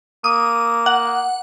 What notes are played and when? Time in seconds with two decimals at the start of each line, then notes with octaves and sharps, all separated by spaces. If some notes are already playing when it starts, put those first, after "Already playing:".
0.24 A#3 D#6
0.86 F#5